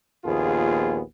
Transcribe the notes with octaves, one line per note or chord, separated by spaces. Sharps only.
A#1 D#2 B3 F4 G#4